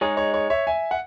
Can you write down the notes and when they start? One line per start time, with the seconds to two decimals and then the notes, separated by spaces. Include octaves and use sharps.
0.01 G#3 D#4 G#4 C#5
0.17 C#5
0.34 C#5
0.50 C#5 E5
0.67 E5 G#5
0.91 F#5